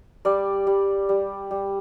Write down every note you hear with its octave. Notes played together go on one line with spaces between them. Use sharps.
G3 D5
G3
G3
G3